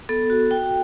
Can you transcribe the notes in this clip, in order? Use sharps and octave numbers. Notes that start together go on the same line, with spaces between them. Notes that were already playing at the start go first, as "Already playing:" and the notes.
B3 A4
F#4
F#4 G5